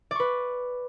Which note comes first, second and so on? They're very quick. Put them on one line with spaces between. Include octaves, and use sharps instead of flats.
D5 C#6 B4